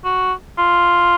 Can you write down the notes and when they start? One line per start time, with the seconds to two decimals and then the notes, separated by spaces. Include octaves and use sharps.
0.05 F#4
0.58 F4